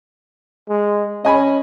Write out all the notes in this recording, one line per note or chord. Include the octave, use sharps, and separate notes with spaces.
G#3
C#4 D#5 G#5 B5